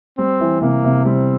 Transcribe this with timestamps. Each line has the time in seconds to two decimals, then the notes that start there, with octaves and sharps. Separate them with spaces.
0.17 G3 C4
0.40 E3
0.61 C3 A#3
0.84 C3
1.05 G3 C4